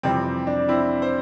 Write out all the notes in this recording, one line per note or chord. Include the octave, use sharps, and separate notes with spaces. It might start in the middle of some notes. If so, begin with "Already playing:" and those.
F2 C3 E3 G3 C4
D4
C4 E4
C5